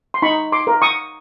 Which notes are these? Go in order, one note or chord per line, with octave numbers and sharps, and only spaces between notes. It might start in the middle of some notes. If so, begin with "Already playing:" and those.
C6
D#4 B5 C#6
C6 D6
A#4
C#6 D#6